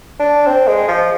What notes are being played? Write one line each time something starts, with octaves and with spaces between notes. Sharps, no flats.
D4
C4
G#3
F3